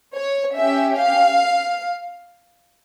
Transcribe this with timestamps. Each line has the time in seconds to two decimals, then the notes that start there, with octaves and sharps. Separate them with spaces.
0.15 C#5
0.55 C#4 G4 E5
0.96 F5